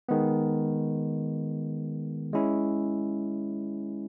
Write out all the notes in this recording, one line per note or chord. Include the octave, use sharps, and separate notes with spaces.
D#3 G#3 B3
G#3 C#4 E4